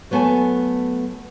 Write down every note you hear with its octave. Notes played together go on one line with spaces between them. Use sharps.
F#3 A3 B3 F5 G#5 A5